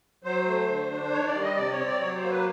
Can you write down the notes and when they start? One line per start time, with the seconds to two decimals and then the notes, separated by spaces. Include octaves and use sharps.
0.24 F#3 C5
0.47 A3
0.69 D3
0.90 D4
1.12 D#3 C#5
1.27 D5
1.34 G3
1.42 D#5
1.56 C3 D5
1.71 C#5
1.78 C4
1.86 D5
2.00 F#3 C#5
2.15 C5
2.23 A#3
2.30 B4